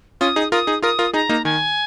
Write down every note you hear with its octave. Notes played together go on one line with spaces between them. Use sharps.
C#4 F4 D#6
D#4 G#4
F4 A#4 D#6
D#4 G#4
F4 A#4 D#6
F4 A#4
D#4 G#4 A#5
A#3 D#4
D#3 G#5